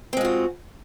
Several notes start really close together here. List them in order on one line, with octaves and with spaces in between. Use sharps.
C4 G#3 F4 F#4